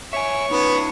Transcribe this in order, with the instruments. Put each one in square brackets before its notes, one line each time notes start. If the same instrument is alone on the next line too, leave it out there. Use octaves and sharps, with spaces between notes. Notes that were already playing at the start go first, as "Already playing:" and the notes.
[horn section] C#5 [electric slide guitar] E5 G#5 [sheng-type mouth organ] C#6
[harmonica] B3 [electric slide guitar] C#4 D#4